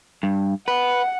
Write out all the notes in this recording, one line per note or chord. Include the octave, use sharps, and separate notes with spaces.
G2
B4 F#5